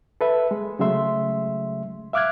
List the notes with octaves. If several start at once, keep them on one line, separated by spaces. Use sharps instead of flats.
A4 B4 E5
G#3
C#3 F#3 G#3 A3 E5 C6
E5 F5 D6 F6 F#6 G#6